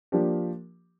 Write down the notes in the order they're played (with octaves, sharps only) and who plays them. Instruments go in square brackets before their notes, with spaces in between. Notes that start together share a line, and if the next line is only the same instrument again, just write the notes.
[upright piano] F3 A#3 D4 G4